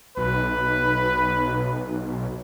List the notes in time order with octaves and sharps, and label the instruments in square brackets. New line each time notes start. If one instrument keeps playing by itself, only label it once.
[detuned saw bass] B1 [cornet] B4